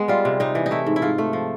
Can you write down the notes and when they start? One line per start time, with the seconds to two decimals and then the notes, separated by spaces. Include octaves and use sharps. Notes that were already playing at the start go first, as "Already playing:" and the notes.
Already playing: G#3 B3
0.08 G3 F4
0.25 C3
0.40 C3 D#4
0.55 E3
0.66 D#4
0.71 A3 E4
0.86 G#2
0.96 E4
1.02 G#2 F4
1.18 A3
1.33 F3